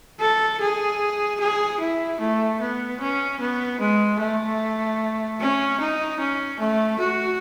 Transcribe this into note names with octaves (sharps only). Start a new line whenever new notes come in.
A4
G#4
G#4
E4
A3
B3
C#4
B3
G#3
A3
C#4
D#4
C#4
A3
F#4